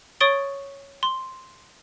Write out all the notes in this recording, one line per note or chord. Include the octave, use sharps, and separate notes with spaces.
C#5 C#6 D#6 A6 D7 G7
C6